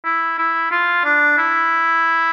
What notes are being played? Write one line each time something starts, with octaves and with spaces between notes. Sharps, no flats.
E4
E4
F4
D4
E4